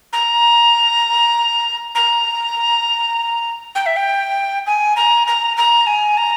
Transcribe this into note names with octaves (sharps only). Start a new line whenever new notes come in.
A#5
A#5
G5
E5
G5
G#5
A#5
A#5
A#5
G#5
A#5